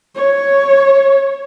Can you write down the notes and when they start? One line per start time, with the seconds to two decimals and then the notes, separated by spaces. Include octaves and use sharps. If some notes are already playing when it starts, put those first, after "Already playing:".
0.16 C#5